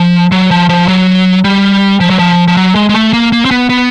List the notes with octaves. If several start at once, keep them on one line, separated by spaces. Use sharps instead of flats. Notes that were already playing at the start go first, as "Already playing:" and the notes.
Already playing: F3
F#3
F3
F3
F#3
G3
F3
F#3
F3
F3
F#3
G#3
G#3
A3
A#3
A#3
C4
B3
B3